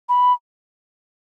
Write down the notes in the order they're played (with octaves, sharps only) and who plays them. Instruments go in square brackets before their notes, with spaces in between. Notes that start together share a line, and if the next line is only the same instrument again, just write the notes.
[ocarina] B5